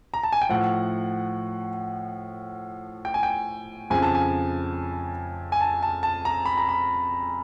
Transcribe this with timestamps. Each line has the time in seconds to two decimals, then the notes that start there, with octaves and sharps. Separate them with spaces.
0.14 A#5
0.23 A5
0.32 G#5
0.42 G5
0.49 A2 F3 F#5
3.05 G5
3.14 G#5
3.23 G5
3.90 F2 C#3 F3 G#5
4.02 A5
4.15 G#5
5.52 G#5
5.61 A5
5.83 A5
6.03 A5
6.25 A#5
6.46 B5
6.57 A#5
6.69 B5